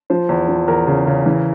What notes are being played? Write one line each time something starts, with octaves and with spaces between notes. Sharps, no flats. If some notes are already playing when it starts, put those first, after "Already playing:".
F3 C5
E2
F3
E2 A#4
C#3
C#3
E3